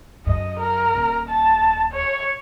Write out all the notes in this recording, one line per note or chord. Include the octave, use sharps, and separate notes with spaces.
F#2 D#5
A#4
D#1
A5
C#5